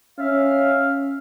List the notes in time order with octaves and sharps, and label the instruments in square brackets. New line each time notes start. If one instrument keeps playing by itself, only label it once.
[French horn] C#4 [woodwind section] E5 F5